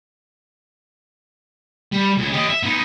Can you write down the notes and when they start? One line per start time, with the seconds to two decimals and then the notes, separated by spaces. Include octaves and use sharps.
1.93 G3
2.18 C#2
2.33 G4 D#5
2.50 E5
2.63 B3 D#4